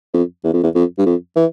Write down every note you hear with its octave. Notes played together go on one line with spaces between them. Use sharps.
F2
E2
F2
E2
F2
G2
F2
E3